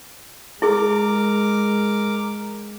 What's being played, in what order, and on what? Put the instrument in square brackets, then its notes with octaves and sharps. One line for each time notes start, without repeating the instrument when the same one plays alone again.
[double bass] G#3 [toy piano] E4 G#4 [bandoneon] A#4 D6